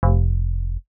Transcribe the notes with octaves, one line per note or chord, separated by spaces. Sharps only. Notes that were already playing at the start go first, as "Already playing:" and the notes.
F1